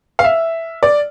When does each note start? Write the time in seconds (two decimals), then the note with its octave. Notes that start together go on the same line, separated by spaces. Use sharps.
0.19 F5
0.24 E5
0.83 D5